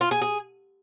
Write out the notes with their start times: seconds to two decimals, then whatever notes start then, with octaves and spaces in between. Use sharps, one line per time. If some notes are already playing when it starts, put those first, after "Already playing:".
0.01 F4
0.11 G#4
0.22 G#4